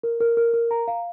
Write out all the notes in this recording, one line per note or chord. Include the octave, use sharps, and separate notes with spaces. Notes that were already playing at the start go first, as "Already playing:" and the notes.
A#4
A#4
A#4
A#4
A#5
F5